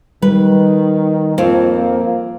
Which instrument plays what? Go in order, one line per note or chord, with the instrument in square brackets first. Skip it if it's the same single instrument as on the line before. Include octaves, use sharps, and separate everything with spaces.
[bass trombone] D#3 [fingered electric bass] G3 [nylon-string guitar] B4
[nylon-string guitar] F2 C4 [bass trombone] A#3